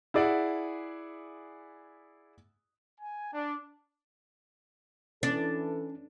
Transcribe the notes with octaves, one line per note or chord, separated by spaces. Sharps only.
E4 G#4 D5 E5 F#5
G#5
D4
E3 C#4 D4 A4